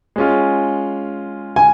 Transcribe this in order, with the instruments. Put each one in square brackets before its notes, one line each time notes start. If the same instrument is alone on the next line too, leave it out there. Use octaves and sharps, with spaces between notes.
[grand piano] G#3 C#4 F4
[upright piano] G#5